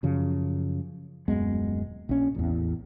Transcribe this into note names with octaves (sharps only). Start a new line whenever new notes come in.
F#2 C#3 F3
D#1 F#2 G#3 B3
A#1 C#4
A1 E2